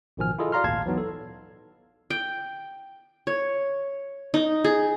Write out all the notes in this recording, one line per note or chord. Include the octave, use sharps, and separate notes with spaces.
A1 B2 D#3 F3 G#5 F6
E4 F4 G#4 A4 D#5
F#4 D5 F5 A#5 C6 F6
G#1 D2 A#2 F5 A5 G#6
E3 F#3 B3 D#4
A4
G5
C#5
D#4
G#4